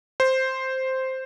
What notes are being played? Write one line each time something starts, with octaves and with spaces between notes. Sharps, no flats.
C5